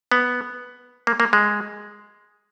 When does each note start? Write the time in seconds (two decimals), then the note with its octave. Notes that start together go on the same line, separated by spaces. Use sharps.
0.12 B3
1.07 A#3
1.20 A#3
1.33 G#3